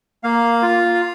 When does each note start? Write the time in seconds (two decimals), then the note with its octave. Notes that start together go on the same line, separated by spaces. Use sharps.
0.23 A#3 F5
0.62 F4